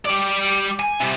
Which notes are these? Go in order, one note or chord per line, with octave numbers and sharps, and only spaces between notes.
G3 D5
G#5
C3 G3